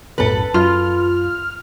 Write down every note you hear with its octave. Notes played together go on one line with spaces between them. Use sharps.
B1 F#2 A2 A4 B4
F#2 F4 F6